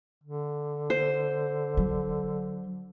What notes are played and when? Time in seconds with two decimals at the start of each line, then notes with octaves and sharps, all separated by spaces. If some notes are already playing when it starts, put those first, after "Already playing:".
0.23 D3
0.90 C5
1.77 F#3